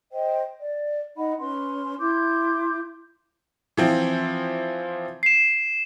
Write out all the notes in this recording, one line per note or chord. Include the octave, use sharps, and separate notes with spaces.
C5 D#5 G5
D5
D#4 D#5 F#5 B5
C#4 B4 C6
E4 C6 D6 G6
E3 F3 C4
C7 E7